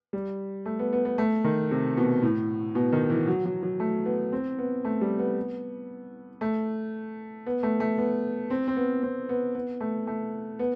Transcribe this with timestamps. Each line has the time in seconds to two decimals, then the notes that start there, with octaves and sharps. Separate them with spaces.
0.13 G3
0.66 A3
0.79 B3
0.93 B3
1.05 B3
1.18 A3
1.44 D#3
1.71 C3
1.97 B2
2.22 A2
2.75 B2
2.93 D#3
3.10 E3
3.27 F#3
3.45 F#3
3.63 F#3
3.80 A3
4.06 B3
4.32 C4
4.58 B3
4.85 A3
5.01 G3
5.19 B3
6.41 A3
7.46 B3
7.63 A3
7.80 A3
7.98 B3
8.50 C4
8.68 C4
8.76 B3
9.03 C4
9.29 B3
9.55 B3
9.81 A3
10.07 A3
10.59 B3